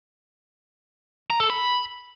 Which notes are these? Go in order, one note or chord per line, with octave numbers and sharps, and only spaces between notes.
A#5
A4
B5